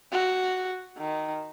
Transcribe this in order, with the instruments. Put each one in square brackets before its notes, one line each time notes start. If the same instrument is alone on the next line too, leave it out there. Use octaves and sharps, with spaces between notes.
[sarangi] F#4
D#3